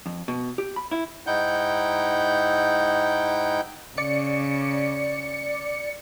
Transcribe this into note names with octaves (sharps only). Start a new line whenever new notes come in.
F2
B2
G4
B5
E4
G#2 D#4 E4 F#5 G5 G6
C#3 D5 C#7